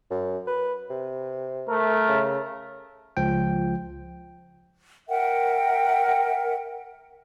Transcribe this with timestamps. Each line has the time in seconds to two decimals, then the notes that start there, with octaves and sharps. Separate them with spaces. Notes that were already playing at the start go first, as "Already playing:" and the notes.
0.10 F#2
0.47 B4
0.90 C3
1.68 A3 A#4
2.09 C#3
3.17 C#2 F3 G5
5.09 A#4 E5 F#5 G5